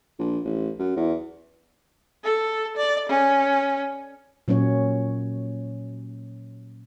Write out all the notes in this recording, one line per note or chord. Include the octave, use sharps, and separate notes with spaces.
A#1
A1
F#2
E2
A4
D5
C#4
A#2 F#3 A#3 C#4 C#5